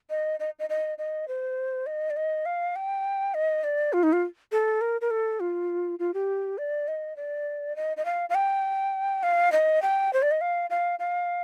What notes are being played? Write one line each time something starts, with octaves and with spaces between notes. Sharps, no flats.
D#5
D#5
D#5
D#5
D#5
C5
D#5
D5
D#5
F5
G5
D#5
D5
F4
D#4
F4
A4
A#4
A#4
A4
F4
F4
G4
D5
D#5
D5
D#5
D#5
F5
F5
G5
F5
D#5
G5
C5
D5
D#5
F5
F5
F5